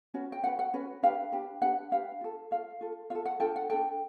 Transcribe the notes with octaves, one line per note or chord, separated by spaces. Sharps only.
C#4 F#4 B4
G5
C#4 F#4 B4 F#5
F#5
C#4 F#4 B4
D4 G4 B4 F5
D4 G4 B4
D4 G4 B4 F#5
D4 G4 B4 F5
F4 A4
F4 A4 F5
F4 A4
F4 A4 F5
F#5
D4 F4 A4 G5
F#5
D4 F4 A4 G5